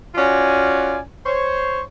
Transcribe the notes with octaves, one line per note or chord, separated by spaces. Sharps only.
C#4 F4 F#4 D5 G#5
C5 C#5